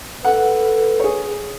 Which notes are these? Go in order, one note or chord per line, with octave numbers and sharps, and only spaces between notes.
A4 B4 F#5
G#4 C#5